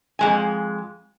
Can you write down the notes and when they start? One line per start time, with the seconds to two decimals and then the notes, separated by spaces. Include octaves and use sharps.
0.19 F2 G#3 G#5